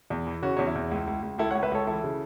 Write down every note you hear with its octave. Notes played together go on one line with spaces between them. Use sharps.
E2
E3
C#3 C#4 F#4
E2 C#4
E4
E2
C#2
C#2
C#2
C#2 E4 A4
C#5 F#5
C#2
B4 E5
C#2 A4 C#5
E3 E4 A4
C#3